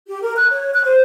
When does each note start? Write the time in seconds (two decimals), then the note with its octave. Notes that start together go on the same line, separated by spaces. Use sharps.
0.08 G4
0.22 A#4
0.36 F#6
0.50 C#5
0.73 F#6
0.85 C5